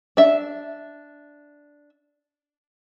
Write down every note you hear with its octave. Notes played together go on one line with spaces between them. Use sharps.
D4 E5